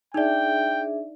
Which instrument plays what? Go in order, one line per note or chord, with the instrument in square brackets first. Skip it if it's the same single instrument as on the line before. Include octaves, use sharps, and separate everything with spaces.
[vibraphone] D4 G#4 E5 [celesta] D#4 D5 [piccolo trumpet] G5